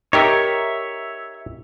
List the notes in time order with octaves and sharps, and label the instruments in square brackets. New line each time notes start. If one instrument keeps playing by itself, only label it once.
[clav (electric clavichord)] D#4 G4 A#4 [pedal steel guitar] C#5 E5